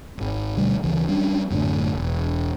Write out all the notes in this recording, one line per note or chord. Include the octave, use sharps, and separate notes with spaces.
D#1 G#1
D2 B2 G3
D2 C#3 E3
F#3 G3 C#4 D4
F#2 A2 D3
E1